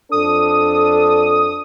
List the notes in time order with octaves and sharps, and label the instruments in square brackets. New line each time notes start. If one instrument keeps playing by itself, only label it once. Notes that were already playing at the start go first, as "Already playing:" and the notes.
[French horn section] F2 D4 A4 [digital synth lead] D#6